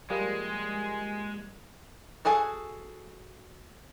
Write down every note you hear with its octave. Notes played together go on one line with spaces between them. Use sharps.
F3 G3 G#3 A#3
F#4 G#4 A4 G#5